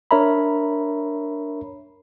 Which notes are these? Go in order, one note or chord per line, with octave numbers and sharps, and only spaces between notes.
D4 A#4 C#5 E5 A#5 B5